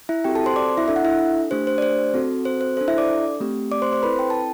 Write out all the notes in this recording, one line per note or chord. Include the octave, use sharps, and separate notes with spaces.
E4 E5
C4 F#4 G4 A4 G5
A4 A5
C5 C6
D5 D6
E4 E5
D4 A4 E5
F#5
E4 E5
A3 D4 G4 C5
C5
D5
C5
C4 F#4 A4
C5
C5
D4 A4 C5
E4 E5
D5 D6
A3 C4 G4
D5 D6
C5 C6
C5 C6
C4 E4 A4 B4 B5
G5
A5